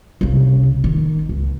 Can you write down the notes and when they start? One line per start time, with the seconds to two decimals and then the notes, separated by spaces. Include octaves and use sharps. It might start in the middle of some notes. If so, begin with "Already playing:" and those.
0.21 C2 C#3
0.84 D#3
1.29 C#2